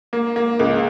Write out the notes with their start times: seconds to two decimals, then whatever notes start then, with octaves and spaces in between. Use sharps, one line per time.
0.13 A#3
0.36 A#3
0.59 C#2